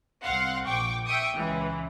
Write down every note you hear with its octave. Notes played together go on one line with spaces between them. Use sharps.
C2 C4 F5 F#5 C6
A#1 G5 C#6 D6
E5 G5 C#6 D#6
C#2 E3